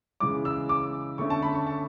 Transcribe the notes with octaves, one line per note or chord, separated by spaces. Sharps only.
C#3 E3 G#3 D6
E6
D6
D3 A3 C#4 C#6
A5
B5
C#6
A5